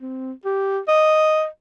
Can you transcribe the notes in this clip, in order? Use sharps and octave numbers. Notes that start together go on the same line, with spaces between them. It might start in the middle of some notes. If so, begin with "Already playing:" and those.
C4
G4
D#5